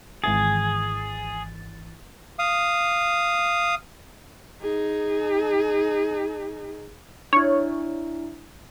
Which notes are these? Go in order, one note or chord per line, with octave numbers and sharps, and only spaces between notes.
G#1 E3 G#4 A6
F5 D#6
D#4 G#4
D4 E4 C#5